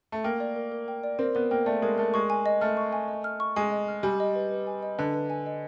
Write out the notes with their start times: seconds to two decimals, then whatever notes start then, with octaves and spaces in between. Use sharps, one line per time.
0.12 A3
0.24 A#3 G5
0.40 D5
0.56 A#4
0.72 A#4
0.88 G5
1.04 D5
1.19 C4 A#4
1.35 B3 A#4
1.51 A#3 G5
1.66 A3 D5
1.82 G#3 A#4
1.98 A3 A#4
2.14 G#3 C#6
2.30 G#5
2.46 D#5
2.61 A3 F6
2.77 C#6
2.93 G#5
3.08 D#5
3.24 F6
3.40 C#6
3.56 G#3 G#5
3.72 D#5
3.88 F6
4.03 G3 G#5
4.20 D#5
4.35 B4
4.51 B4
4.67 G#5
4.83 D#5
4.99 D3 B4
5.14 B4
5.30 G#5
5.46 D#5